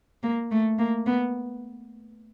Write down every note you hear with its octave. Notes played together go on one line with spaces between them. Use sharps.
A#3
A3
A#3
B3